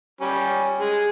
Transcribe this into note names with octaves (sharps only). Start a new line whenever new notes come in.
G3 C#4
G#3 G#4